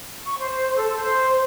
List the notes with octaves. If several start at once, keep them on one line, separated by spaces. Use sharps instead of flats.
C#6
C5
A4
C5